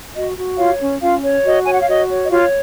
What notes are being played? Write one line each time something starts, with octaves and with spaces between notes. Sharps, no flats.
F#4 D#5
F#4
F4 C#5 F5
C#4
C#4 F4 F5
C#5
F#4 D#5
C#5 G#5
F#5
F5
F#4 D#5
C#5
D#5
F4 C#5 F5